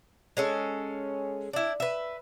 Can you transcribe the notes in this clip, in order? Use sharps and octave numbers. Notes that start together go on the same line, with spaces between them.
G#3 C#4 A4
D4 E4
B4 E5